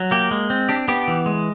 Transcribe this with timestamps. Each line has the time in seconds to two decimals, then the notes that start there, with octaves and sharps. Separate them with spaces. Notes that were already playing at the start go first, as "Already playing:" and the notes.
Already playing: F#3
0.11 A#3 G4
0.31 G#3
0.50 C4
0.69 D4 G4
0.88 B3 G4
1.08 E3
1.26 G#3